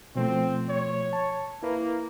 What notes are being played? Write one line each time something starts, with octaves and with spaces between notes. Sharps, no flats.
B2 F3 A3 C4
C#5
A5
A#3 E4 B4